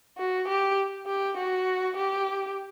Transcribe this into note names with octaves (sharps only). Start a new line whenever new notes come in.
F#4
G4
G4
F#4
G4